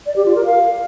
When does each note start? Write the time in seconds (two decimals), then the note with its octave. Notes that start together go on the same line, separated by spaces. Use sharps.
0.06 D5
0.16 G4
0.26 F4
0.35 A#4
0.45 F5